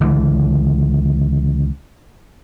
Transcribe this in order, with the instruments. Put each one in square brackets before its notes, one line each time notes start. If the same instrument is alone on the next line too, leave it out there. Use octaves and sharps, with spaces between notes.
[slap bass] C#2 D3 E3